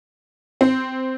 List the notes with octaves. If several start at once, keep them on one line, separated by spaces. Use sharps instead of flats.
C4